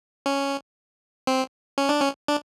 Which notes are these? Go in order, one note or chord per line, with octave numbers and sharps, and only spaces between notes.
C#4
C4
C#4
D4
C#4
D4